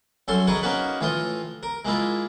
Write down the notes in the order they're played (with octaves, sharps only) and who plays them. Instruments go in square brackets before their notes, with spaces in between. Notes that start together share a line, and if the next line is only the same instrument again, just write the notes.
[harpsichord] F#2 C#4 A4 C6
G#4 A#4 B4 D#5 G#5 C#6
A#3 C#4 D#4 F#4 B4
A2 E3 F4 C6 D#6
A#4
G#3 A#3 E4 F4